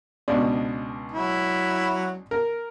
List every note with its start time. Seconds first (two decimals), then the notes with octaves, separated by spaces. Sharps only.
0.28 C#2 B2 D4
1.12 F#3 E4
2.31 A#4